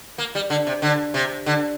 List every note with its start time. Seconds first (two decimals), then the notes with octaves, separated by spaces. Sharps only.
0.18 A#3
0.35 G3
0.50 D3
0.67 C3
0.82 D3
1.14 C3
1.46 D3